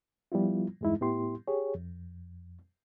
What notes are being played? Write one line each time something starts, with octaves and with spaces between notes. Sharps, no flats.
F3 G3 B3 E4 F4
E2 G2 G#3 D#4 E4
A2 B3 E4 G4 C6
G4 G#4 C#5
F2